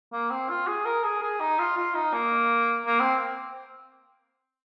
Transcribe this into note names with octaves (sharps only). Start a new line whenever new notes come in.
A#3
C4
F4
G#4
A#4
G#4
G#4
D#4
F4
F4
D#4
A#3
A#3
C4